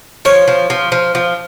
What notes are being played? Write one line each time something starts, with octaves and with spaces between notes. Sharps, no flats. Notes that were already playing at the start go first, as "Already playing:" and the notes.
F3 C#5
F3
F3
F3
F3